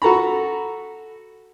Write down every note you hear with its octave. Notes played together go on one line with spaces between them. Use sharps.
F#4 A4 A#5 B5